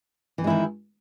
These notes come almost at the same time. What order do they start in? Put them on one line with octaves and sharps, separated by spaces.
E3 C4 G#3 E4 D#3